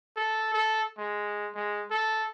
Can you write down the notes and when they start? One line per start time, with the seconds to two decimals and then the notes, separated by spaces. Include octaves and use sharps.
0.16 A4
0.54 A4
0.98 G#3
1.55 G#3
1.91 A4